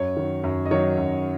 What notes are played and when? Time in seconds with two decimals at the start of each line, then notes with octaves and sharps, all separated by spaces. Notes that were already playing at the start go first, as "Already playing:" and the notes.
Already playing: F#2 C#5
0.17 D#3 F#3
0.44 F#2
0.66 D#5
0.71 D#3 F#3 C#5
0.97 F#2